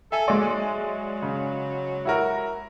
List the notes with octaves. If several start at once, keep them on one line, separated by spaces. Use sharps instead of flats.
A4 E5 G#5
F#3 G#3 D5
C#3
E4 F#4 A#4